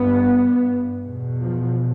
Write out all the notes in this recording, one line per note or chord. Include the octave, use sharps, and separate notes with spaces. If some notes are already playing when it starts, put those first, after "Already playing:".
Already playing: G2 B3
E2 B2
F3